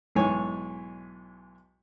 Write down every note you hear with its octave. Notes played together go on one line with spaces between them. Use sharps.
B1 G#2 E3 C#5 G#5 C#6